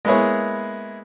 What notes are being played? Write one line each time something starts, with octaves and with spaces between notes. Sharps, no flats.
G#3 A#3 B3 E4 G#4 C#5